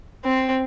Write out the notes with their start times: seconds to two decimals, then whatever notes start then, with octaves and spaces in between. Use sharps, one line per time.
0.25 C4